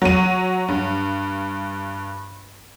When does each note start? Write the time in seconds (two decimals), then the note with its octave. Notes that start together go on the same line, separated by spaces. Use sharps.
0.02 F#3 D#7
0.68 G2